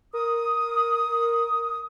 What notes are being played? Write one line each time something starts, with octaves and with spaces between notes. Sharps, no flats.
A#4 D#6